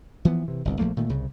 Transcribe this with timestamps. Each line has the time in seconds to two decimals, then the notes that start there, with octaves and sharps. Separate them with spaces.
0.25 E3 F3 B3
0.48 C3 E3
0.65 G1 C2
0.79 A#1 F3 A3 A#3
0.97 A#2 D#3 A3
1.10 C2 C#3